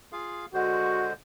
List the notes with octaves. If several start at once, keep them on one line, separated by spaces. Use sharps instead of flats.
F4 G#4 F5
D3 G#3 F#4 C5